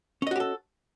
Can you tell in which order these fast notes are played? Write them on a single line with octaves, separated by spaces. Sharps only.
C#4 D#5 F#4 G4 A4